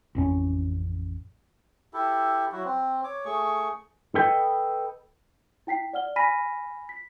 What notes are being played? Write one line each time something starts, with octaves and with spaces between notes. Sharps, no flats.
A1 F2 C#4
E4 G4 A4
F#3 E4 F#4
C4
C#5 D6
A3 G#4 C#6
A4 B4 D#5 G5
E4 G5 B6 C7
D5 F#5 F6 G7
G#5 B5 F6 A#6 B6 D#7
B6